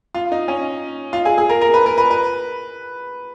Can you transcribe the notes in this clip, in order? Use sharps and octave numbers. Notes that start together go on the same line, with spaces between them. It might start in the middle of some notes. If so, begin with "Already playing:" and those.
F4
D#4
C#4
F4
G#4
G#4
A#4
A#4
B4
A#4
B4
B4